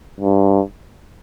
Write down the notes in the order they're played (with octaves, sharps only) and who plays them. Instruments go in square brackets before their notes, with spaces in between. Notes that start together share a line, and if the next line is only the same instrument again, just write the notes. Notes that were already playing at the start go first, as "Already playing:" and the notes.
[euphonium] G2